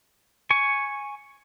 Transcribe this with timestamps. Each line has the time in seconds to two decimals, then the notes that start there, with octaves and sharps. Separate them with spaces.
0.50 G#5 C#6